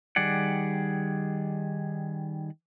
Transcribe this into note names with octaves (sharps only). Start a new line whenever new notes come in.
D#3 G3 G#4 D5 F#5